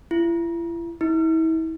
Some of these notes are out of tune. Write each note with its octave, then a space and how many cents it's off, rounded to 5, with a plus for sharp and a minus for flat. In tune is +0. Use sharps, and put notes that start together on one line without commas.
E4 +40
E4 -35